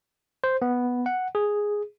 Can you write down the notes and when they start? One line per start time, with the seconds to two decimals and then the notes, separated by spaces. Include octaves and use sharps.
0.44 C5
0.62 B3
1.06 F#5
1.35 G#4